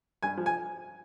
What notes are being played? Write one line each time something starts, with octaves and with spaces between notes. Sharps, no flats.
G2 G#5
F3
G#5